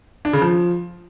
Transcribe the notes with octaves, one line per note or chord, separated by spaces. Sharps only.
D4
C#3
F3